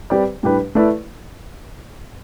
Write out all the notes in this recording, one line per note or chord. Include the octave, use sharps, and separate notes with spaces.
G3 C4 G4 B4 D5
A2 G3 D4 G4 B4
A3 E4 B4 D5